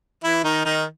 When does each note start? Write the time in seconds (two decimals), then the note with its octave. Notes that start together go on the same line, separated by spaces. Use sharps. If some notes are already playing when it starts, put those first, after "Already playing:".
0.24 E3 E4
0.44 D#3 D#4
0.65 D#3 D#4